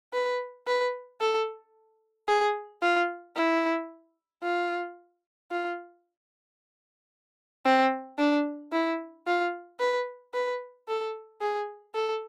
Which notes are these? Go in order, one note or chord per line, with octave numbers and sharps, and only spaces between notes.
B4
B4
A4
G#4
F4
E4
F4
F4
C4
D4
E4
F4
B4
B4
A4
G#4
A4